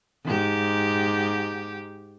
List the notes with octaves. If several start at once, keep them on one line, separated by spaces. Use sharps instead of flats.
G#2 G4